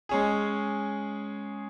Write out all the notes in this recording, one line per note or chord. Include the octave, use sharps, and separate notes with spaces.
G#3 C#4 G#4